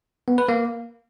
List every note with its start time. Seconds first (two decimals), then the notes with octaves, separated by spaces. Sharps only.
0.28 B3
0.38 B4
0.48 A#3